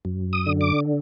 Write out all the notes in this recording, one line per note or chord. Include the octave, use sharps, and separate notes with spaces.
F#2
D#6
D3
D6